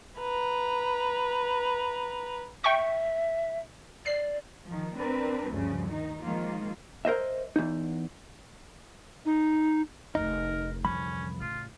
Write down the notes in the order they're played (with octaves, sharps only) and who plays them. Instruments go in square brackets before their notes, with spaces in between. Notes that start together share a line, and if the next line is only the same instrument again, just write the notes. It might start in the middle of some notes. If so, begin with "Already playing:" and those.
[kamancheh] B4 A#5
[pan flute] E5 [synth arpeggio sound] G5 C#6
[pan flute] D5 [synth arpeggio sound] C7
[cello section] D#3 F3
C4 D4 A#4 B4
D2 G2 C#3 F3
D#3 D#4
D#3 F3 G#3 A#3 F4
[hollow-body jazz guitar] A#4 C5 D#5 E5
E2 D#4
[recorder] D#4
[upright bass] F1 D2 [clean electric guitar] D#4 [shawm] A#4
[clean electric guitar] C2 F2 B5 [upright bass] D3 E3 [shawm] C#4
[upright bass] A1 C#3 [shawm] F4